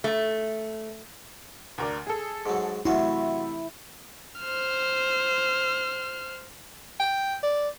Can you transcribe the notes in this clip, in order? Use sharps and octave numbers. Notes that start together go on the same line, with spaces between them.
A3
D2 A#4 D5
G#4 A4
G#2 F#3
C3 F#3 A3 E4 F#4 C6
C5 F6
G5
D5